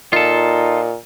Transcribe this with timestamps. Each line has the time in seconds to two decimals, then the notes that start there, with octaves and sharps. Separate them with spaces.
0.13 A#2 D#4 F4 A4